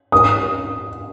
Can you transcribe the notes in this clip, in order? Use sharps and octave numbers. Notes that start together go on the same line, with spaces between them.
D#6